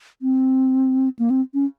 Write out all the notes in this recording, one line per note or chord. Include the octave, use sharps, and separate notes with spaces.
C4
A#3
C4
C#4